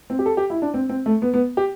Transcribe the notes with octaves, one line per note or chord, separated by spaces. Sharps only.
C4
G4
A4
G4
E4
D4
C4
C4
A3
B3
B3
G4